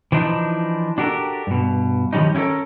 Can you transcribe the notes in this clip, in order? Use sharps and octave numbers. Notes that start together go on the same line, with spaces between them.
E3 F3 D4 D#4
D4 F#4 G4 A4 A#4
G2 B2
D#3 F3 G3 C#4 D#4
C#4 E4 F#4 A4 A#4